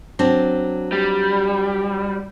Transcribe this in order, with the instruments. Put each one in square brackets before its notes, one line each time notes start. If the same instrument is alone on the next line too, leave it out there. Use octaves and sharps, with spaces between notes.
[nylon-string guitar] F#3 C4 D4
[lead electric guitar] G3